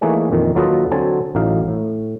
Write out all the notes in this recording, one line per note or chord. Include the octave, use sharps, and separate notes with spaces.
E3 A3 A#3 D#4 G#4 C#5
F2 A#2 D#3
D#2 F#3 F4 A4 B4 D#5
D3 F#3 C4 G#5 A5
A1 A2 F#3 D#4 F5
A2